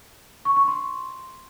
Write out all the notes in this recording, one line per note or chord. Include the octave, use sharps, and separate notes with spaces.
C#6
C#6
C6